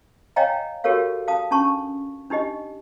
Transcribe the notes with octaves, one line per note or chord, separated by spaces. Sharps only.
C#5 D#5 F5 G5 G#5 A#5
F#4 G4 A4 A#4 C#5 F5
F5 A5 D#6
C#4 D4 A5 C#6
D4 D#4 G4 D#5